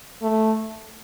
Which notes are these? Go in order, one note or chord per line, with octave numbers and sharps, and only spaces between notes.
A3